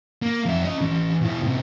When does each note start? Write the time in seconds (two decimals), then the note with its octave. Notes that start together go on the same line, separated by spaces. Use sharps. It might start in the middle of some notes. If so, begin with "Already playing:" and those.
0.22 A#3
0.46 F2 E5
0.65 C#4 D#5
0.81 E3 C#4
1.22 B2 E4
1.43 A2 C3